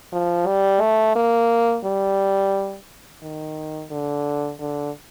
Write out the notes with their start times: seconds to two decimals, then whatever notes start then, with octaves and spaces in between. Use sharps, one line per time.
0.12 F3
0.47 G3
0.81 A3
1.16 A#3
1.84 G3
3.22 D#3
3.91 D3
4.60 D3